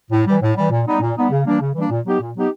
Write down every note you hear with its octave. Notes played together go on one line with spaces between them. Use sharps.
A2
E3 G3
A2
E3 G3
A#2
G3 B3 D#4
A#2
G3 B3 D#4
C#3
E3 G3 A#3 D4
C#3
E3 G3 A#3 D4
A#2
F#3 B3 D#4 G4
A#2
F#3 B3 D#4 G4